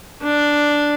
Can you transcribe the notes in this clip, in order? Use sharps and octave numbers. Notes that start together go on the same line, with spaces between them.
D4